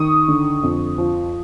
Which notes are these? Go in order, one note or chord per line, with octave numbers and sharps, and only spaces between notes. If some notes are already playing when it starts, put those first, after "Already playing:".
Already playing: D#3 C#6 D#6
D3
F2
F3